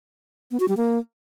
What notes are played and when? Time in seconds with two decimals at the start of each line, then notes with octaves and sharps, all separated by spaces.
0.51 B3
0.60 F#4
0.68 G3
0.77 A#3